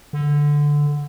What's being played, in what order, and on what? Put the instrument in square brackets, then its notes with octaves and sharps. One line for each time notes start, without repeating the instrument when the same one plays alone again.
[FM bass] D3